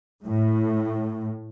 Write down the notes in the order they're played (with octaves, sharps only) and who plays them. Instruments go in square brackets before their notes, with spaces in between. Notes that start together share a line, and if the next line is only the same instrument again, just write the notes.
[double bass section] A2